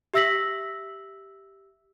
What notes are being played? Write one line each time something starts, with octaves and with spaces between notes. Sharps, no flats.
G4 E5 E6 A#6 B6 F#7